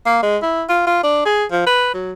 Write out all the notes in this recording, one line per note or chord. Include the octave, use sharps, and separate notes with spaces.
A#3
G#3
E4
F4
F4
D4
G#4
F3
B4
F#3